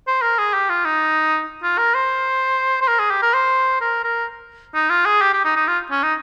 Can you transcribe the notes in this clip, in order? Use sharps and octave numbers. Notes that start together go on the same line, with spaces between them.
C5
A#4
G#4
G4
F4
D#4
F4
A#4
C5
C5
A#4
G#4
G4
A#4
C5
A#4
A#4
D#4
F4
G#4
G4
G4
D#4
D#4
F4
C#4
D#4